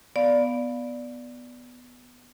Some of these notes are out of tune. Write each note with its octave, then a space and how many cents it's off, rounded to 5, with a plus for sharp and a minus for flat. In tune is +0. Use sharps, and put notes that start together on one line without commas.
B3 +0 D5 +0 F5 +5